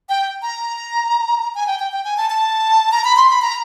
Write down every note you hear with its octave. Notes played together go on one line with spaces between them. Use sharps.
G5
A#5
G#5
G5
G5
G5
G#5
A5
A5
A#5
B5
C6
B5
A#5